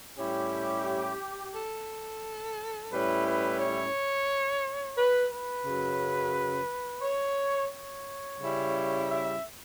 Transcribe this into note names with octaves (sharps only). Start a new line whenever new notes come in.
A2 G3 C#4 E4 G4
A4
A2 G3 C#4 E4 B4
B4
C#5
B4
B4
F#2 C#3 F#3
C#5
C#5
C#3 G3 C#4 E4
E5